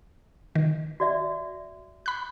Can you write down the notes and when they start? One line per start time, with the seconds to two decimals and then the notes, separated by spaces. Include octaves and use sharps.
0.55 D#3
1.00 F#4 D5 E5
2.06 B5 F#6